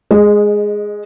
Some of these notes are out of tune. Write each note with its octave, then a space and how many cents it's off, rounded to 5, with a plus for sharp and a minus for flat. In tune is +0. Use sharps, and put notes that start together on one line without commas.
G#3 +0 D#5 -25